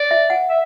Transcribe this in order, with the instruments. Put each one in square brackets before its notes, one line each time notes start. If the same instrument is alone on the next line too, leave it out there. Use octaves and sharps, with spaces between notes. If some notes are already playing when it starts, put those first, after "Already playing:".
Already playing: [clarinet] D5
[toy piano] E5
F#5
[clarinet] E5